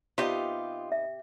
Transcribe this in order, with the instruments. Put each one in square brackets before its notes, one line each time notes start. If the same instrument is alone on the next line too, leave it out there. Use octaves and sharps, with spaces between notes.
[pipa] C3 G4 [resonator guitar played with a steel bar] B3 D#4 D#5 [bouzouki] F4
[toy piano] E5